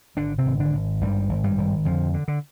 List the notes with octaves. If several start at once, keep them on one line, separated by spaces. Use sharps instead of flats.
G#1 D3 D4
C3 C4
G#1
D3 D4
G#1
G#1 G2 G3
G#1
G2 G3
G#1
F2 D3 F3
D3
D3